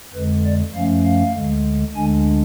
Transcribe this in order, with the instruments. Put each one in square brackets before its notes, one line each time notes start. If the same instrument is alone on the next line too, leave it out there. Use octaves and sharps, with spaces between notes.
[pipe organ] F2 D3 G#3 B4
D5
F#2 F3 A3 C#4 F5
F5
D2 D3 G#3
D2 D3 G#3 D4 G#5